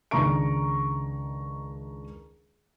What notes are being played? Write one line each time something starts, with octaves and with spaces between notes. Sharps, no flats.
C#2 D#3 D4 A#5 C#6 D7